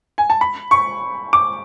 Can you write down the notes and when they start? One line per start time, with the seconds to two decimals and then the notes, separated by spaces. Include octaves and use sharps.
0.18 G#5
0.30 A5
0.41 B5
0.71 C#6
1.33 D6